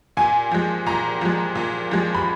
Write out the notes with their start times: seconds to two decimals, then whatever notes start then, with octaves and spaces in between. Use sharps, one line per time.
0.17 A#2 G#5
0.51 F3 G#3
0.86 A#2 A#5
1.21 F3 G#3
1.55 A#2
1.91 F3 G#3
2.14 B5